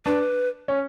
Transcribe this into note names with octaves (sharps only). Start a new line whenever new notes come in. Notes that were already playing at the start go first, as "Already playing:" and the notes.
D4 B4
C#4